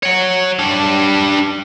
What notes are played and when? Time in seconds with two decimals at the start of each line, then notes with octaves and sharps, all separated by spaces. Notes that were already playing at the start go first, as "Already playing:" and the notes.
0.03 C#5 F#5
0.59 G3 D4